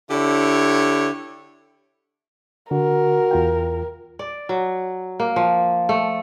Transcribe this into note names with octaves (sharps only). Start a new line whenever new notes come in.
D3 E4 G4 C#5
D3 F#4 A#4
E2 F4 G5
D5
F#3
A#3
F3
A3